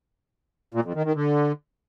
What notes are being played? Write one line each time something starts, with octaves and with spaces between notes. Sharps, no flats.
A#2
F2
D#3
D#3
D3